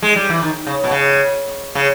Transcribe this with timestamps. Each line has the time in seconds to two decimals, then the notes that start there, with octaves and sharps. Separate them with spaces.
0.02 G#3
0.16 G3
0.30 E3
0.43 D#3
0.67 C#3
0.84 B2
0.91 C#3
1.75 C#3